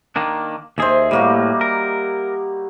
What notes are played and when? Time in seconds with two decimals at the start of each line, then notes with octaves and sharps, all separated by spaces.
0.16 D#3 A#3 D4
0.78 D#2 G#4 C5 D#5 E5
1.11 A2 G3 A#3 F#4
1.61 A#4